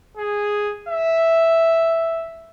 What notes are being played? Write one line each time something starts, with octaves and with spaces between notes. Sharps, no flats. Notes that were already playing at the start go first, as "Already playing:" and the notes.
G#4
E5